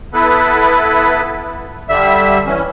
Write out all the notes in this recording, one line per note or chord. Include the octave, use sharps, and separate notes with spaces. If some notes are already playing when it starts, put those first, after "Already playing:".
B3 E4 A4 B4
D3 G3 E5
E3 C#4